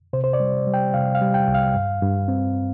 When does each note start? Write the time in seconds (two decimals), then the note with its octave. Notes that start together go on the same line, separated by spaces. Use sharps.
0.13 C3 C5
0.24 C5
0.33 D5
0.40 G3
0.67 G3
0.74 G5
0.94 C3 F5
1.15 F5
1.21 G3
1.34 G5
1.48 C2
1.54 F5
1.75 G2
2.02 G2
2.28 C4